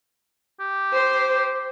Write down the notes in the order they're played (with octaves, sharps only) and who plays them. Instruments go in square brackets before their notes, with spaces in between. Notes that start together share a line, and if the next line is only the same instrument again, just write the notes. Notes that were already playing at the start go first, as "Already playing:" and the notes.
[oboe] G4
[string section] C5